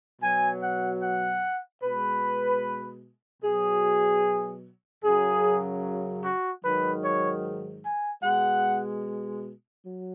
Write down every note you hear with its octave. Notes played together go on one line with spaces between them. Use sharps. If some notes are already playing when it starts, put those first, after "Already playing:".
B2 F#3 G#5
F#5
F#5
B2 G#3 B4
B2 F#3 G#4
F#2 C#3 F#3 G#4
F#4
G#2 D#3 F#3 B4
C#5
G#5
B2 G#3 F#5
F#3